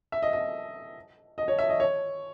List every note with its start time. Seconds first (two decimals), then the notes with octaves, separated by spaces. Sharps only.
0.12 E5
0.22 D#5
0.33 D#5
1.38 D#5
1.48 C#5
1.59 E5
1.69 D#5
1.80 C#5